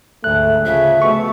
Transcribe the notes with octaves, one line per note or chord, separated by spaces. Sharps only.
D2 G#2 A3 F#6
C#3 F3 E5
B2 A3 C#6